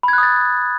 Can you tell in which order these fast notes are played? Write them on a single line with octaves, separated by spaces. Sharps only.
B5 G#6 F#6 D#6 A6